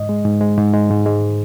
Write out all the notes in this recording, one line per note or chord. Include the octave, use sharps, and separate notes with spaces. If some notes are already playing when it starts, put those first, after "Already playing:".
Already playing: G#2 D#5
G#3
G#2
G#3
G#2
G#3
G#2
G#3